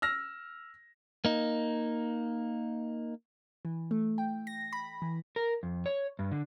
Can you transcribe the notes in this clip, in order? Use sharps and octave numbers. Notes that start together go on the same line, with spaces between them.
E6 F6 A#6
A#3 D#4
E3
A3
G5
A#6
B5
E3
A#4
F2
C#5
G2
D3